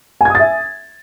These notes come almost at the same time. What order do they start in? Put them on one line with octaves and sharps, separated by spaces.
G#5 G#6 D#6 A6 E5